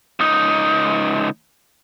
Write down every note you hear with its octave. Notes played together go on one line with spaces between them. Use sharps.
C#2 D#4